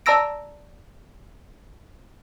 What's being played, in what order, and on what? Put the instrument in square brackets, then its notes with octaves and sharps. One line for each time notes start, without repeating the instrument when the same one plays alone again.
[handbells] D5 A5 A#5 E6 A#6 D7